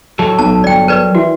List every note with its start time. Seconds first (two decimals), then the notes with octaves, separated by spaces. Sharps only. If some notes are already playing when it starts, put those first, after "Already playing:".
0.19 F#3 A4
0.39 B1 A5
0.64 G1 D5 G5
0.88 A#4 B4 D5
1.15 E3 F#4